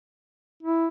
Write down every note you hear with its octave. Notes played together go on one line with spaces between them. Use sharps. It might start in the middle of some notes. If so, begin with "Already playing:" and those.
E4